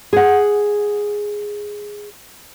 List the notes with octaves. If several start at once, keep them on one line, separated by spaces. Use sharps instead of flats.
G#4 F#5